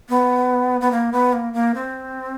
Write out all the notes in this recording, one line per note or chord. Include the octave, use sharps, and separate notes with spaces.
B3
B3
A#3
B3
A#3
A#3
C4